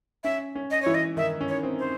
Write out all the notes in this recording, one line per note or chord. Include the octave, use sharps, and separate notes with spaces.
C#4 E5
C#4
D#5
E3 E4 C#5
D#5
D#3 D#4 E5
C#4
C#5
C4
C5